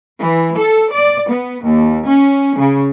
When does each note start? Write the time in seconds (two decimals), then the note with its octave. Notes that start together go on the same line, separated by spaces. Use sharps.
0.19 E3
0.55 A4
0.92 D5
1.29 B3
1.63 D#2
2.07 C#4
2.56 C#3